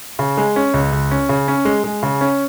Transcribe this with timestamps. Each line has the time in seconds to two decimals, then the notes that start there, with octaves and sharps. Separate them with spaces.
0.19 C#3
0.37 G#3
0.56 C#4
0.74 C#2
0.92 C#2
1.11 C#4
1.29 C#3
1.48 C#4
1.65 G#3
1.84 G#3
2.03 C#3
2.21 C#4